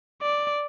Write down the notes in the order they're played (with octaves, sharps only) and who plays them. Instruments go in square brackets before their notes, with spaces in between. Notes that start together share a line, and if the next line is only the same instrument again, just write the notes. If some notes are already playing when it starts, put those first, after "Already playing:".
[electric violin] D5